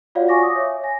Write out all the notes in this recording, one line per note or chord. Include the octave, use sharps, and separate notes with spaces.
F4 F#4 C#5 D5 F5 F#5
F5 G#5 C#6 D6 A#6
D6 D#6
C#5 E5
G#5 A#6